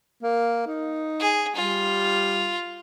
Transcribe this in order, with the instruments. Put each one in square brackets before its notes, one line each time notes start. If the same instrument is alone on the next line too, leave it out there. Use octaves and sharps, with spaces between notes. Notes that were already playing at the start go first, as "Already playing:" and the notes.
[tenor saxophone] A#3
D#4
[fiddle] G#4
[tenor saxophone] G3 [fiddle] F4